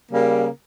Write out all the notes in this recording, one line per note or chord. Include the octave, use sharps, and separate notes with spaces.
C#3 G3 A#3